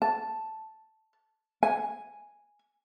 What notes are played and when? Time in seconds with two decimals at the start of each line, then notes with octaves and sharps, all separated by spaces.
0.02 A5
1.63 G#5